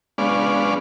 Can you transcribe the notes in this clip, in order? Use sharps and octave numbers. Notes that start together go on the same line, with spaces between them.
G#3 B3 C#4 D4 D5 F5